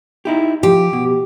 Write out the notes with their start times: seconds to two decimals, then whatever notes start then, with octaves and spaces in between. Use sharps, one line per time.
0.25 D#4 E4 G4
0.63 F3 G4
0.93 B2